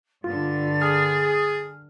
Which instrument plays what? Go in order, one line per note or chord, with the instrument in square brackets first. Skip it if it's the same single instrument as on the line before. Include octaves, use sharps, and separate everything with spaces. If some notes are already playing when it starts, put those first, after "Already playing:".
[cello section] G2 D3 [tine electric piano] F4 [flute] A6
[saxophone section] G#4 [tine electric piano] F6